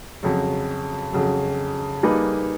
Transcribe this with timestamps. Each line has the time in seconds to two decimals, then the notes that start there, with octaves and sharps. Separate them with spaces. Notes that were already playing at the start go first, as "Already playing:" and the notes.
0.23 F2 C#3 F#3
1.13 F2 C#3 F#3
2.03 G3 A#3 D#4 G#4 B4